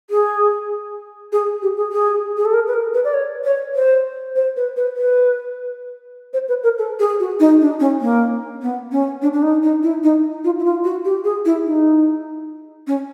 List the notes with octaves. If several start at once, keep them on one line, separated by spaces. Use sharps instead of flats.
G#4
G#4
G4
G#4
G#4
G#4
A4
A#4
B4
A#4
B4
D5
C#5
C#5
C5
C5
B4
B4
B4
C5
B4
A#4
A4
G#4
F#4
D#4
D4
C#4
A#3
B3
C#4
D4
D4
D#4
D#4
E4
D#4
F4
E4
F4
F#4
G4
G#4
E4
D#4
C#4